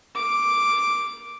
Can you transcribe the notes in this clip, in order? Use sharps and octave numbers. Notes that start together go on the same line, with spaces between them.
D6